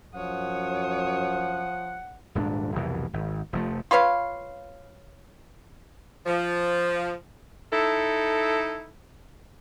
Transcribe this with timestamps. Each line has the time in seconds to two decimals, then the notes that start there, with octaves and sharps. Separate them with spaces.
0.15 F#2 F3 C#5 F#5 D#6
2.35 D#1 G#2 C#4 D4
2.75 C2 F2 B2 E3
3.13 G#1
3.53 F1 F3 A3
3.91 F4 B4 C#5 F5
6.26 F3
7.72 D#4 E4 A4